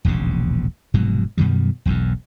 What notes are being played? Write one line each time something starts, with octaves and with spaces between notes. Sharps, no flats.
E1 A#1 D#2 C#3
F1 G#2 B2 F#3
F#2 B2 D#3 G3
E1 B1 E2 G#2